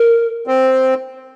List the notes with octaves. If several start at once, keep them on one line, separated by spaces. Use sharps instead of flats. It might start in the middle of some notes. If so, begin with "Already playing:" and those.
Already playing: A#4
C4